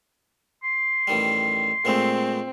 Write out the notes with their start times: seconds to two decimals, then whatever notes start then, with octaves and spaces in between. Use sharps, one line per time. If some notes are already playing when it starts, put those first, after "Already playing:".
0.64 C6
1.07 A1 D#3 G3
1.85 A#2 G#3 A3 C4